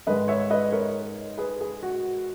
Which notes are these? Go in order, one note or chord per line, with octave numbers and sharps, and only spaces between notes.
G#2 D#3 G#3 B4 D#5
C#5 E5
B4 D#5
A#4 C#5
G#4 B4
G#4
F#4